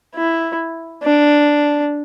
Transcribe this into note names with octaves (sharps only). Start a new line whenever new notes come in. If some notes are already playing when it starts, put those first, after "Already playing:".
E4
D4